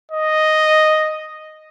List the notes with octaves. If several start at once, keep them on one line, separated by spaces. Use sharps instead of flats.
D#5